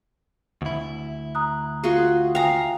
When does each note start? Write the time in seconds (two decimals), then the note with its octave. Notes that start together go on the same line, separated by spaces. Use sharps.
0.62 D2 E4
1.35 A#5 D#6 F#6
1.84 F4 F#4 G#4
2.35 F5 G5 G#5 A#5 D#6